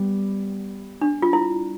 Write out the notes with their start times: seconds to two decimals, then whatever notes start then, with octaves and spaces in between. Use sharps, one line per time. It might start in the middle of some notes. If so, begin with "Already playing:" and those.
Already playing: G3 B3
1.02 D4
1.22 F4
1.33 E4